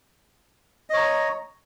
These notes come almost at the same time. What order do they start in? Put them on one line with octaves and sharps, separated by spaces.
D#5 C#5 A#5